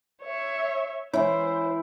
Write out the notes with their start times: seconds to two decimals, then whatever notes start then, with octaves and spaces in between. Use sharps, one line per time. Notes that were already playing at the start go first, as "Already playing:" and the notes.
0.22 C#5 E5
1.14 E3 E4 C5 C#5